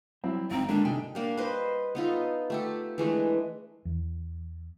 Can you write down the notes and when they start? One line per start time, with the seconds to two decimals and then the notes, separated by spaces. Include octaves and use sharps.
0.24 F#3 G3 C4 E4
0.51 G#1 D#3 C4 A#5
0.69 D3 G3 G#3 A#3 D4
0.85 C3 A3 D#4 G5 G#5
1.15 G3 A#3 D4
1.37 B4 C5 D#5
1.95 B3 D#4 F4 A4
2.50 A3 G4 A4
2.98 E3 G#3 A3 D4
3.85 E2